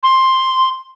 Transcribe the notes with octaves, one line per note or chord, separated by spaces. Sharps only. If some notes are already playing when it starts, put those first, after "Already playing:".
C6